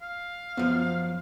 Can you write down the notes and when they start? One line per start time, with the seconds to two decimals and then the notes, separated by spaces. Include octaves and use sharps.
0.02 F5
0.57 F#2 F3 B3